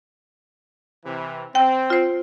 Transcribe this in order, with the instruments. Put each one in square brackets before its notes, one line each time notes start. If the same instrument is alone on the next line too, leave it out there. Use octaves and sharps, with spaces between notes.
[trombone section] C3 E3
[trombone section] C4 [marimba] G5
[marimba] F4 C5